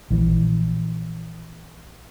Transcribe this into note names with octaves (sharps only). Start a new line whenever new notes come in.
A#1 E3